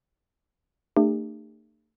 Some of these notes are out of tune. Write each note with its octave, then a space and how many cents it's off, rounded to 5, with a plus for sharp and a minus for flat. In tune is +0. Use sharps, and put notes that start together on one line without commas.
A3 +35 D4 +45 G4 +45